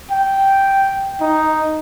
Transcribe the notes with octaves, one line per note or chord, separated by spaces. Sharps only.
G5
D#4